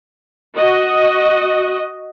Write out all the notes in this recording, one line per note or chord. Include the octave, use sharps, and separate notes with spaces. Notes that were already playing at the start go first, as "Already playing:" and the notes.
F#4 D#5